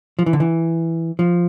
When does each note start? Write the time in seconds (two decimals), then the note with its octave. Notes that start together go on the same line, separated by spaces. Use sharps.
0.19 F3
0.26 E3
0.33 D3
0.40 E3
1.19 F3